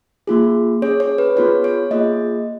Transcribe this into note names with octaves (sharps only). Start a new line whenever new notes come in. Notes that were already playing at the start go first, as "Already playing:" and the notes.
A#3 F4 G#4
C#4 G#4 C#5
C#5
B4
B3 F4 G#4 C#5
C#5
A#3 F4 G#4 D#5